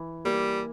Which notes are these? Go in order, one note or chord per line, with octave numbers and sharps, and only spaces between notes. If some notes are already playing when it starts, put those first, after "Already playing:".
Already playing: E3
G3 A#3